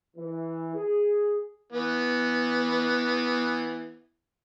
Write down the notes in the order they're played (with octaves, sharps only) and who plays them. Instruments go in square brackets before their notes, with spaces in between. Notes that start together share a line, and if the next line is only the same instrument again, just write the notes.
[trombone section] E3
G#4
[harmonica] E3 B3